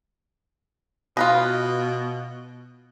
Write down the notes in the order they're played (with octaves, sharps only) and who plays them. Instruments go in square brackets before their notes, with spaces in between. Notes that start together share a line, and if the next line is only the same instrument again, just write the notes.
[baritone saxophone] B2 [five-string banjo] F4 B4 D#5